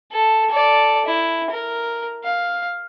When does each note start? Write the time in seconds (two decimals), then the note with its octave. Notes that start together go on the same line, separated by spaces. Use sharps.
0.12 A4
0.50 A4 D5
1.06 E4
1.50 A#4
2.24 F5